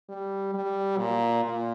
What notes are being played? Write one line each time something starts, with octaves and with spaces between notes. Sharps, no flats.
G3
G3
A#2
A#2